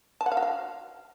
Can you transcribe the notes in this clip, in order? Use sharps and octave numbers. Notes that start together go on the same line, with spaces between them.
A5
F#5
F5
F#4
F5